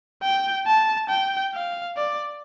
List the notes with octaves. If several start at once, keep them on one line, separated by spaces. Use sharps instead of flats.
G5
A5
G5
F5
D5